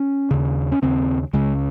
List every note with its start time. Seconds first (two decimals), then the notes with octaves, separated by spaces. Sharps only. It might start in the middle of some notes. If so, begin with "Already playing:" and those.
Already playing: C#4
0.31 D#2 C#3
0.72 C#4
0.82 D#2 C#3 C4
1.33 C#2 C#3 G#3